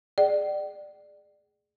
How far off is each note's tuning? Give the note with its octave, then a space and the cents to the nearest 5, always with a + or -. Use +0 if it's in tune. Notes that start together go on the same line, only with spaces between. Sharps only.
G#4 +0 D5 +20 G5 -45